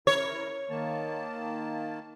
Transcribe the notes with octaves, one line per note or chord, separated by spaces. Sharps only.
E4 A#4 C#5
D#3 A#3 A5